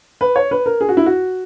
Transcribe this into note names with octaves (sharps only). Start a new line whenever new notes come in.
B4
C#5
B4
A#4
G#4
F#4
E4
F#4